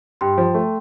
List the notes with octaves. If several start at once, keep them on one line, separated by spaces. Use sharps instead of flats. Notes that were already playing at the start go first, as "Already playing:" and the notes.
G2 G5 C6
F3
A3